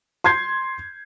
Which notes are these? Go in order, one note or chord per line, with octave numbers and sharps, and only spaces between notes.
C6 G6 G#6 C7